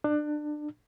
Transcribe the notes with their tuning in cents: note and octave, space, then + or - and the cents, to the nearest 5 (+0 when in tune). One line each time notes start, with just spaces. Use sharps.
D4 +25